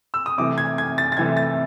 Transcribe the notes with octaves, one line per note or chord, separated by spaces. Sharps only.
E6
D#6
C3 E3 A3 D6
G#6
G#6
A6
A6
C3 E3 A3 G#6
A6